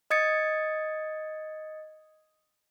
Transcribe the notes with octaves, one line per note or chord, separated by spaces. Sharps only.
D#5 D#6 G#6 A6 C#7